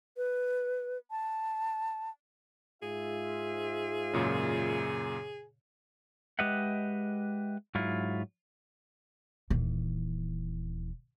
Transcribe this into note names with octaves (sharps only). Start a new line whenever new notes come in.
B4
A5
G#2 F4 G#4 E5
F#2 A#2 C#3
G#3 G4 B4 D#5 E5 F#5
G#2 F#3 E4 F4
D#1 E3